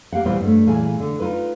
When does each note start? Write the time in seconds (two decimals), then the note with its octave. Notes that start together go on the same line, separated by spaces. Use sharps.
0.12 A#3 G4 F5 F#5
0.25 E2 A#2 E3 G3 B3 C5
0.41 G2 A3
0.67 A#2 E3 G#4 G#5
1.00 D3
1.20 D#4 F4 B4